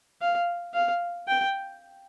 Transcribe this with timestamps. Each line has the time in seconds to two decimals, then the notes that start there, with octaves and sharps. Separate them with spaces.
0.21 F5
0.74 F5
1.28 G5